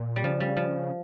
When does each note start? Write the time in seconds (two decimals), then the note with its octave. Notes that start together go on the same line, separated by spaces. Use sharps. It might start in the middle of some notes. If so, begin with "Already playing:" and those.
Already playing: A#2
0.16 G3
0.23 C#3 F3
0.40 G3
0.57 F3